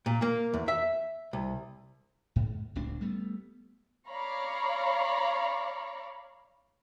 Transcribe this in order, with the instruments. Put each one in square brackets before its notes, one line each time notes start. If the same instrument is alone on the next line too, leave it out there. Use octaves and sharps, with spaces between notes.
[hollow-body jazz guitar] A#2
A#3
E2
E5
C2
[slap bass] G#2
D1 C#2 C4 D4
G3 A3 B3
[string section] C#5 D5 F5 A#5 B5 C#6